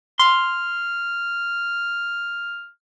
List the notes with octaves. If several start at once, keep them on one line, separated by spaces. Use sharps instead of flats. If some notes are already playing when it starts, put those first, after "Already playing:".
C6 F6